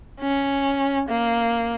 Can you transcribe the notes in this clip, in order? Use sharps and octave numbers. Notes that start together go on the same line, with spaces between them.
C#4
A#3